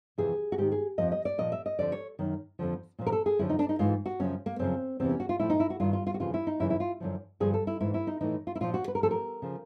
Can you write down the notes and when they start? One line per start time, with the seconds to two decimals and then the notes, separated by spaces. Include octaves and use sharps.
0.18 F2 C3 E3 G#4
0.52 F#4
0.58 G#2 D#3 G4
0.72 G#4
0.98 F2 C3 F3 D#5
1.12 D#5
1.25 D5
1.38 A#2 F3 D#5
1.52 E5
1.66 D#5
1.78 F2 D3 F3 D5
1.92 C#5
2.19 F#2 D#3
2.59 F2 D3 F3
2.99 A#2 F3
3.06 A#4
3.12 A4
3.26 G#4
3.39 F#2 D3 F3 E4
3.49 D#4
3.59 D4
3.69 D#4
3.79 G#2 E3 F4
4.06 F#4
4.19 F#2 C#3 F3 C#4
4.46 A#3
4.59 F#2 C#3 F3 C4
5.00 E2 C3 E3 C4
5.09 C#4
5.20 F#4
5.29 F4
5.39 A2 F3 E4
5.50 D#4
5.60 E4
5.70 F#4
5.80 G2 D#3 F4
5.93 F4
6.07 F4
6.14 F#4
6.20 F2 C#3 E3 F4
6.34 E4
6.47 D#4
6.60 F#2 C#3 E3 E4
6.70 E4
6.80 F4
7.00 F#2 D3 F3
7.40 G2 D3 F3 G#4
7.54 A4
7.67 E4
7.80 G#2 E3 E4
7.94 E4
8.07 D#4
8.21 A2 E3 D#4
8.47 F4
8.55 E4
8.60 A#2 F3 F4
8.74 F#4
8.88 B4
8.95 A#4
9.01 A2 F3 A4
9.11 A#4
9.42 C#3 F3